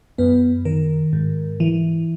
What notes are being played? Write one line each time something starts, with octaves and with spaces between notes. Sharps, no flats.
F#2 B3 B4
D#3 A#4
G#2
E3